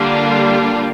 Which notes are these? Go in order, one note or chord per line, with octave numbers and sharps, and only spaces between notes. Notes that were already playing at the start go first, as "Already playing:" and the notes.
Already playing: D3 G3 A#3 D4 F4